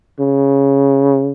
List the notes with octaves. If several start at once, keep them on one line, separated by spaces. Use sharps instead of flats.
C#3